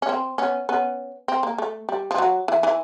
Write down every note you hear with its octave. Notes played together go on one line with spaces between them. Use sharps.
C#4
C4
B3 C#4
B3 C#4
C4
A#3
A3
G3
F3
F#3
E3
E3